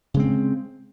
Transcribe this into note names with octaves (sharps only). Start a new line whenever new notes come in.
C#3 G#3 C4